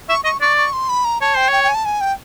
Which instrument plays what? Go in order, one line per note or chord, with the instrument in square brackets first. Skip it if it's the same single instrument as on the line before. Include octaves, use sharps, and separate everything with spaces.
[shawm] E5 [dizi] C#6
[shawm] D#5 [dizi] C#6
[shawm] D5 [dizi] C#6
[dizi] C#6
C6
B5
A#5
[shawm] C#5 [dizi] A5
[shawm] C5 [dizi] G5
[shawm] C#5 [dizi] G5
[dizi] G5
G#5
A5
G#5
G5